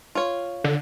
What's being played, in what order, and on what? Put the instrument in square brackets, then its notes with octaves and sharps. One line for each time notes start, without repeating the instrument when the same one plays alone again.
[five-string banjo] F4 C#5
[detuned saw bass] D3